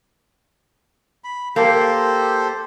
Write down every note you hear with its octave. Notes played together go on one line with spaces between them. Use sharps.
B5
A#3 G4 A4 C5